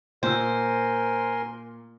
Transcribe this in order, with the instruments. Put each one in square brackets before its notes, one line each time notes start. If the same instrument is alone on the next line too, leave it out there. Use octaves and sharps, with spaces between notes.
[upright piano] A#2 E6 [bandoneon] A#4 G#5 C6 [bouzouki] C5